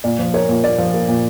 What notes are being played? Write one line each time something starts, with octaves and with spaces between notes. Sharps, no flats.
A#2 D5
F3
A#3 C#5
A#2
A#2 D5
F3
A#3
A#2